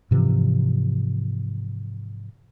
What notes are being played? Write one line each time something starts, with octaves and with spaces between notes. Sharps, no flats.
G#2 C3 E3 F3